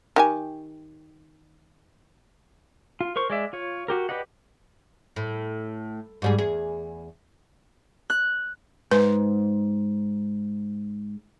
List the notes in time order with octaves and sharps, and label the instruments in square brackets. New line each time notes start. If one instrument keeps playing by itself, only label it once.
[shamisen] D#3 G4 G#5
[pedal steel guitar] F4
A#4 C5 C#6
G#3 D5 E5
F4 C#5
F#4 G4 A#4
G4 B4 D5 D#5 F#5
[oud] A2
G#2 G3 G#4
E2 G#4
[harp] F#6
[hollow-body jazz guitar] G#2 [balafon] B4